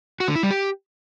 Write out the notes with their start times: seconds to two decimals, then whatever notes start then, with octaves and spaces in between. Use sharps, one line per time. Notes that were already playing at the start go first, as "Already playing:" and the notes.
0.20 F#4
0.28 D3
0.35 E4
0.43 G3
0.51 G4